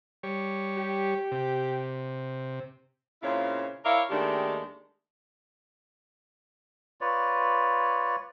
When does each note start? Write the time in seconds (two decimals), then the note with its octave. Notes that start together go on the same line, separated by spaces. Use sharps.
0.23 G3 C#5
0.77 G4
1.31 C3
3.23 A#2 C#3 C4 E4 C#5 F5
3.84 E4 A#4 C#5 D5 E5 F5
4.10 D#2 D#3 G#3 A3 D4 G4
7.01 F4 B4 C#5 D5